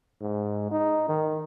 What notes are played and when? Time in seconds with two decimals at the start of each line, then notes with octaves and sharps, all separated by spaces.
0.21 G#2
0.71 D#4
1.09 D#3